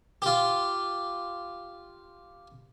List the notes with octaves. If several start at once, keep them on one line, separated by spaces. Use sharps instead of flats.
F4 G4